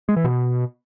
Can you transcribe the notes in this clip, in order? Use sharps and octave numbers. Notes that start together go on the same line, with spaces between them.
G#3
E3
B2